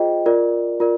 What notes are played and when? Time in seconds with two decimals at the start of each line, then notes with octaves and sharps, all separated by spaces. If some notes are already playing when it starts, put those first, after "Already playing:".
Already playing: F4 G#4 C5 D#5 G5
0.26 F4 A#4 D5
0.80 F4 A#4 D5